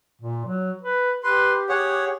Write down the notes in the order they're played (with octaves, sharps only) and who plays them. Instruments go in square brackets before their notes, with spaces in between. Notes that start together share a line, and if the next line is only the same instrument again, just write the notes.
[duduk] A#2
F#3
B4
[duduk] G4 [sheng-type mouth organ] B4 C6
[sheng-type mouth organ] G#4 C#5 F#5